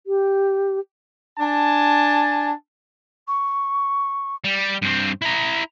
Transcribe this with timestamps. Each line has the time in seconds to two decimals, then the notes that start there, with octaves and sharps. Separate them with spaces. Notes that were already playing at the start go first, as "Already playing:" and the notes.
0.07 G4
1.39 D4 G#5 A5
3.27 C#6
4.44 G3
4.82 G2 C4
5.22 E4 A#5